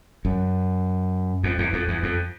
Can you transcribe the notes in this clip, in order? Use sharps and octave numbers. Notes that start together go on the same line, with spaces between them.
F#2
F2
E2
F2
E2
F2